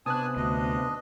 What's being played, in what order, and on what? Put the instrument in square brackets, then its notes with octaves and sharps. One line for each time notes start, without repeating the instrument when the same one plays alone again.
[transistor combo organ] C3 B3 [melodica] D4 G#5 A5 [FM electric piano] D#6 F#6
[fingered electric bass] D2 [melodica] D4 D#5